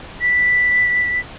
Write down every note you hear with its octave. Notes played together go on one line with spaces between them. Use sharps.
B6